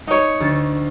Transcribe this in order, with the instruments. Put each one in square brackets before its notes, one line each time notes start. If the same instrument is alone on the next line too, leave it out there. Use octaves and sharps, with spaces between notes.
[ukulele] D#4 C#5
[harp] D2 A6